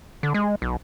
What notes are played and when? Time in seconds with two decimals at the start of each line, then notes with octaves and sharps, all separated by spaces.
0.23 D3
0.34 G#3
0.62 B1